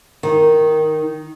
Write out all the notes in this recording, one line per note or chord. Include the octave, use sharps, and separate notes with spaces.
D#3